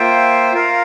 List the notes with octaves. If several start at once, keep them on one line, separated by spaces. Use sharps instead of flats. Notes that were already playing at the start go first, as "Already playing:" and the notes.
Already playing: A#3 F4 C5 E5 G5
F4 A#4 F5